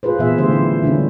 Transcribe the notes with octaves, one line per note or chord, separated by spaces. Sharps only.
F4 G#4 B4 C5
A#2 E3 B3 G#4 E5
D3 E3 A3 G4 C5
F#3 E4
D3 G3 C4 C#4